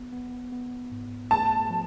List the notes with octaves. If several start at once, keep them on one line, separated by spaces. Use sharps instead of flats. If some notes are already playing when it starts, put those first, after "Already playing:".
Already playing: B3
B3
B3
G#2
A3 A5
F3